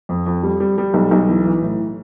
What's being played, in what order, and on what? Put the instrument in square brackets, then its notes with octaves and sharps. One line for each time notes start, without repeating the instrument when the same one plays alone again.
[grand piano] F2
F2
G3
G3
G3
B1
B1
E3
E3
A2